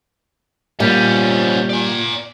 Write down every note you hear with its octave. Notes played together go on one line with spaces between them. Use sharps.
A#2 F3 G3 C#4
D5 G#5